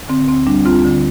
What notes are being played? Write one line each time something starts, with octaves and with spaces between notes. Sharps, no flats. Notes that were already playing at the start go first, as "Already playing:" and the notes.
D3 C4
D2 C4
G3 D4
D2 C4 F4
D3